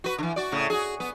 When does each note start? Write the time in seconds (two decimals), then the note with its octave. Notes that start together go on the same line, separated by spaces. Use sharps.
0.04 F#4 B4
0.18 D3 E3
0.36 F#4 D5
0.52 A2 C#3
0.70 F#4 G#4
1.00 B3